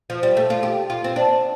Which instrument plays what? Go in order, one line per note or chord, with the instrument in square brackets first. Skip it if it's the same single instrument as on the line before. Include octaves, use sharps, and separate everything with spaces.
[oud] F3
G3
A3
F4
G4
F4
C4
D4